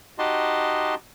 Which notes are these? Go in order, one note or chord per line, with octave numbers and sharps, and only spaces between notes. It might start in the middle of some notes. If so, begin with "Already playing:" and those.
D#4 F#4 G4 D#5 A5 C6